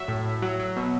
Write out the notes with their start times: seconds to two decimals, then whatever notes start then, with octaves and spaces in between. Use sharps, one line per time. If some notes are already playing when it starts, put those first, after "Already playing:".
Already playing: F#3 E5
0.08 A2
0.25 A2
0.42 F#3
0.60 F#3
0.77 B2